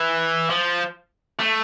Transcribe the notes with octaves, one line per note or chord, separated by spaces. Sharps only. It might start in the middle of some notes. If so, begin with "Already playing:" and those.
Already playing: E3
F3
A3